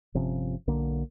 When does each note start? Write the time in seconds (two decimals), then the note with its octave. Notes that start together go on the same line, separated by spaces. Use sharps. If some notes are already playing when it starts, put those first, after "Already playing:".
0.14 G1 C3 F3 C#4
0.67 B1 D3 A#3